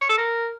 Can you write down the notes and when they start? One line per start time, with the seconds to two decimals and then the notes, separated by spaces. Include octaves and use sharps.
0.01 C#5
0.09 A4
0.18 A#4